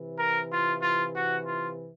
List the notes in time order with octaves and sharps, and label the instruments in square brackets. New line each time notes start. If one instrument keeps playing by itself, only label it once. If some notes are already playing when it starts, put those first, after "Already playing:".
Already playing: [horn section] C3 E3
A#4
F4
F4
F#4
F4